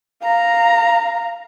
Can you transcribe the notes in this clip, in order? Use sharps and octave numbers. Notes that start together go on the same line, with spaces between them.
F5 A#5